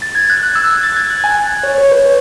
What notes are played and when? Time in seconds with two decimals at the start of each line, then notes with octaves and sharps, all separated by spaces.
0.02 A6
0.15 G#6
0.30 F#6
0.43 F#6
0.56 E6
0.70 G#6
0.83 A6
0.96 G#6
1.10 F#6
1.24 G#5
1.63 C#5
1.78 C#5
1.92 B4
2.04 C#5